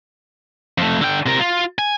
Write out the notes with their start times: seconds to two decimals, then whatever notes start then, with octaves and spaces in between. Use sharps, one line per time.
0.78 F2 A3
1.02 D3 G5
1.26 C3 A#4
1.39 F4
1.79 G#5